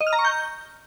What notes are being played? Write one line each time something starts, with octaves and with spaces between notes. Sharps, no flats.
D#5
F6
A#5
C#6
G6